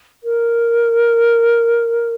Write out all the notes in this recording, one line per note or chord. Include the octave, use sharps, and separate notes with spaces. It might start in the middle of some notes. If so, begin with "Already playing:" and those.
A#4